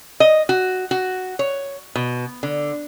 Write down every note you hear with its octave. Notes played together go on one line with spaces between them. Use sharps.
D#5
F#4
F#4
C#5
B2
D3